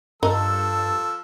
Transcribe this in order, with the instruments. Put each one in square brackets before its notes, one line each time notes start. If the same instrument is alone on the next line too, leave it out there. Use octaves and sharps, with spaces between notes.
[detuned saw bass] G2 [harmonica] F3 E6 [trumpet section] A4 [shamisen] A#4 D#5